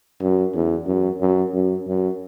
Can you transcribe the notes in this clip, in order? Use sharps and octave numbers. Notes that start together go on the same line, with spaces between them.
F#2
E2
F#2
F#2
F#2
F#2